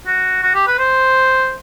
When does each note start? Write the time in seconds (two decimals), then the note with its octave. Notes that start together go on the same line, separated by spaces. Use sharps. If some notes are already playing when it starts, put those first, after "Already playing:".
0.07 F#4
0.42 F#4
0.54 G4
0.67 B4
0.79 C5